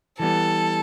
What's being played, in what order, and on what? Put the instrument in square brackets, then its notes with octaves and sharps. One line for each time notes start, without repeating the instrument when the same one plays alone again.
[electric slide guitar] E3 G3 B3 [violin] A4